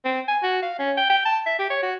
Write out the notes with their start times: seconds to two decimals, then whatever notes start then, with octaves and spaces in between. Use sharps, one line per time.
0.05 C4
0.28 G#5
0.43 F#4
0.63 F5
0.79 C#4
0.97 G5
1.10 G5
1.25 A5
1.46 E5
1.59 G4
1.70 C#5
1.83 F#4